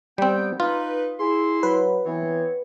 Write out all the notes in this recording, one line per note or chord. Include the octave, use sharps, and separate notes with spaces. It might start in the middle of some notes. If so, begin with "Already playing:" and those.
G3 B3 C4 G5
D#4 F4 B4
E4 G#4 C6
F#3 B4
E3 B3 C4 C#5